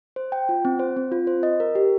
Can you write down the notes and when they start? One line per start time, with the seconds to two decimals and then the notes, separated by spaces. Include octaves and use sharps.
0.16 C5
0.32 G5
0.49 F4
0.65 C4
0.79 C5
0.97 C4
1.12 F4
1.27 C5
1.43 D#5
1.60 A#4
1.75 G4